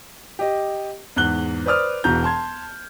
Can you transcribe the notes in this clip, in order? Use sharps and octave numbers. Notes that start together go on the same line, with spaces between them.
G4 D#5
E2 G#2 F#6 G7
B4 C5 D5 D#6 F6
E1 B2 E3 A#5 G6
A5 C6 G#6